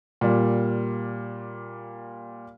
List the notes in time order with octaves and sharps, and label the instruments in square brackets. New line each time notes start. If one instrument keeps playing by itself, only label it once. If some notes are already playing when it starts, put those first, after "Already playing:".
[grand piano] A#2 G3